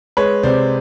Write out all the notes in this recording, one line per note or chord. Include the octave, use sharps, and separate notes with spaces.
G#3 B4 C#5
C3 C5 D5